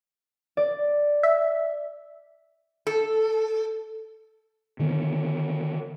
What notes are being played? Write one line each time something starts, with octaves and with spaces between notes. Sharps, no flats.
D5
E5
A4
D3 D#3 B3